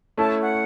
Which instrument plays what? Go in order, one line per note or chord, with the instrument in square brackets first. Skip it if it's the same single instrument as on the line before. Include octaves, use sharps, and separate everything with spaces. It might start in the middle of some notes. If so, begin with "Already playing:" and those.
[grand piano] A3 C#4 E4 A4 [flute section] A5
[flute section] F#5